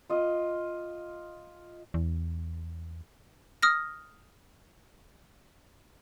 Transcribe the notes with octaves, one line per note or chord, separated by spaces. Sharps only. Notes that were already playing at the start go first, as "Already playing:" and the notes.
F4 D#5
E2
D#6 F6 A#6